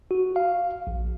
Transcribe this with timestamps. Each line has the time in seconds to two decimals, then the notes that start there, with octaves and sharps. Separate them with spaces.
0.11 F#4
0.36 F5
0.87 A#1